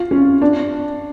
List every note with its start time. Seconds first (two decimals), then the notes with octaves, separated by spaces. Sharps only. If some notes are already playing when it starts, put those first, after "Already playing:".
Already playing: F4
0.11 C#4
0.42 D4